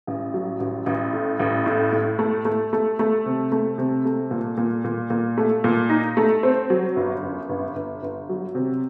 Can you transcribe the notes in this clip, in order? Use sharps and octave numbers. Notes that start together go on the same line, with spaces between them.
A1
F#3
A1
A1
A2
A1
A2
A2
A3
A3
A3
A3
C3
A3
C3
A3
A#2
A#2
A#2
A#2
A3
A#2
D#4
A3
C4
F#3
G1
F#2
G1
G1
G1
F#3
C3